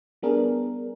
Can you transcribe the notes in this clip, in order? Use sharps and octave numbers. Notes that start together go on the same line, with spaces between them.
G3 B3 D4 G#4 A#4